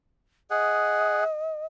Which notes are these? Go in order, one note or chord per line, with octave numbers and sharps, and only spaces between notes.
G#4 D#5 F#5